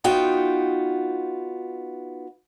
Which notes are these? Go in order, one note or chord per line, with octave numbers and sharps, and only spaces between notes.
B3 D#4 F4 F#4 G5